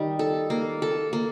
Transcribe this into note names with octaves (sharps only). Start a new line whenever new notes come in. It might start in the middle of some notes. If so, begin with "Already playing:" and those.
Already playing: D#3 G3 D#4
A4
A#3
A4
A#3